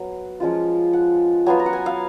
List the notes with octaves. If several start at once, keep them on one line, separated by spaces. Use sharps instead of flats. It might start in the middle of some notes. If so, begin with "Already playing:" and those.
Already playing: F#3 B3
F3 G#3 C#4 F4
F#5
F#3 B3 F4 G#5
A#5
F#5
G#5
F5